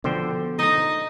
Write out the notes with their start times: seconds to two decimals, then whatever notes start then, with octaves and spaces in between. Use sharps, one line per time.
0.04 B2 D3 F3 B3 C5 G5
0.59 D#4 D#5 A#5